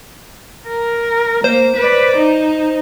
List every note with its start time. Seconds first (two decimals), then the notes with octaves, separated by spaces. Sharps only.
0.68 A#4
1.44 A#3 C5
1.76 B4 D5
2.16 D#4